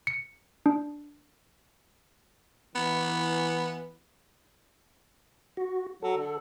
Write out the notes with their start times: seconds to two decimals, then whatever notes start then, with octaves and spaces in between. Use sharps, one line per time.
0.07 C#7
0.66 D4
2.75 E3 B3
5.57 F#4
6.02 F#3 A4
6.18 D3